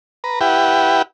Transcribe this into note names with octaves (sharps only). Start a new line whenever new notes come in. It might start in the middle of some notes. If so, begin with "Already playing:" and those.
B4 A#5
E4 G4 B4 F#5 G5